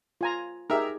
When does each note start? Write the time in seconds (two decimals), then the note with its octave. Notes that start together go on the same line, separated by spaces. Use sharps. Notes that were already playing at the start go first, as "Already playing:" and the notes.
0.21 F4 G#5 A#5
0.70 D#4 G4 G#4 A#4 E5